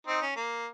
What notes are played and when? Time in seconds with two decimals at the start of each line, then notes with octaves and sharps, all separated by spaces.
0.07 C4 D#4
0.22 C#4
0.36 A#3